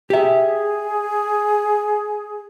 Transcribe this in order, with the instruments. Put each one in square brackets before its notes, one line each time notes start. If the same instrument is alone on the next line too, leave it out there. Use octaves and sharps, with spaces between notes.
[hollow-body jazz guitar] G4 E5 [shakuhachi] G#4